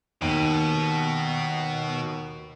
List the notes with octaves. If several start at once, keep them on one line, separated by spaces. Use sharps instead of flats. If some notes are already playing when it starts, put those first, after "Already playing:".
D#2 B2